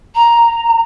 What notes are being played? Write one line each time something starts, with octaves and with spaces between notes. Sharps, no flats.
A#5